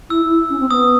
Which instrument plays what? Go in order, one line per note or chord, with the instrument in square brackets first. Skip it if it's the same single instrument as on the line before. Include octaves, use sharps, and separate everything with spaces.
[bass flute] E4 [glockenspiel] E6
[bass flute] E4
C#4
C4
[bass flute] B3 [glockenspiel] D#6